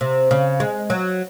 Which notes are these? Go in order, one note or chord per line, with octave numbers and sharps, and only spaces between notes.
C3
C#3
G#3
F#3